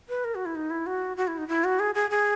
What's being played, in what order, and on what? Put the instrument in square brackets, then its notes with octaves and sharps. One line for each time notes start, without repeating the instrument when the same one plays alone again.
[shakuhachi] B4
A#4
F#4
E4
D#4
E4
F#4
F#4
E4
D#4
E4
F#4
G#4
G#4
G#4